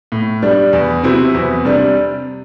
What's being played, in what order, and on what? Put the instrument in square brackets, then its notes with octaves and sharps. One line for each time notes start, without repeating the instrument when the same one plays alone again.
[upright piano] A2
G3 D4
E2
C3 F#3 C4 E4
E2
C3 G3 D4